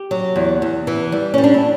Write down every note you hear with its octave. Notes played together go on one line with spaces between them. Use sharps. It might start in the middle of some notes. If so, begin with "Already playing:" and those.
Already playing: G4
F#3
E2
E2
E3
G3
G3 C#4
D4
E4